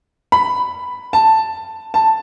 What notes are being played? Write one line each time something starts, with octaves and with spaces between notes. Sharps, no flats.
B5
A5
A5